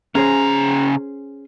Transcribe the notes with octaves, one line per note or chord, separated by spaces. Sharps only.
C#3 C#4 G#4 C5 A#5